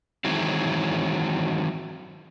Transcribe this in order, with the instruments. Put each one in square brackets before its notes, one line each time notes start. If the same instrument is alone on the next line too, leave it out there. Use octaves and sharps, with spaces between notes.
[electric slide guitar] D#3 E3 F#3 G#3 C4